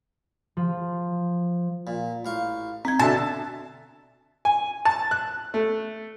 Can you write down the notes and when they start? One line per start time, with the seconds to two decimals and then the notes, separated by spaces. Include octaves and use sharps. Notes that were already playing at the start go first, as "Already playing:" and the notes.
0.57 F3
1.87 A#2
2.25 A1 F5 C#6
2.85 C4 D#4 G#6
2.99 B2 D3 E5 A5
4.45 G#5
4.85 A5
5.11 F#6
5.54 A3